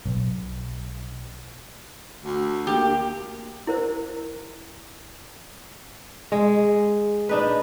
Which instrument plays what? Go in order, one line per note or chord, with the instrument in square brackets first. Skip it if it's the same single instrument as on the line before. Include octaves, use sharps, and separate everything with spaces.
[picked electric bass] B1
[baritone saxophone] D2 [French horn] F#4
[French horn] A#3 [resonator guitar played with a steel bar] G4
[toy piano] E4 A#4 C5
[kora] G#3
D4 D#4 B4